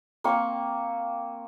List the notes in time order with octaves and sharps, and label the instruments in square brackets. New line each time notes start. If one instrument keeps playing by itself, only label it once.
[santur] A#3 C4 C#6